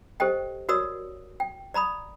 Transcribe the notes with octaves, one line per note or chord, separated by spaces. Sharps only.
G4 A4 C5 D#5 G5
F#4 A#4 C#5 D5 D#6 E6
G5
D5 A#5 B5 D#6